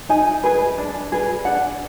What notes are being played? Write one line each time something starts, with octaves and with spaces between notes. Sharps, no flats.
D#4 G#5
G#4 B4
D4
G#4 B4
D4 F#5